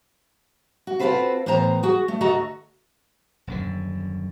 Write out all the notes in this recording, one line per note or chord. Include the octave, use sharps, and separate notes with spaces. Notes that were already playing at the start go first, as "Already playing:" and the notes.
F#4
C4 F4 F#4 A4 B4 C5
A2 E3 B3 C5 A#5
F#4 G#4
A3
D2 F#4 A4 D#5 A#5
D#1 F#2 D3